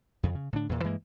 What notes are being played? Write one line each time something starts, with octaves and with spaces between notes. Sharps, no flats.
F2 C#3
C#3
A2 D3 D4
E2 A#2
G2 E3 G#3 A#3